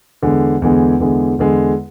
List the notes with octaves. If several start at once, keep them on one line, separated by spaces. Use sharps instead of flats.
E2 D3 G#3
E2 D3 G#3
E2 D3 G#3
E2 D3 G#3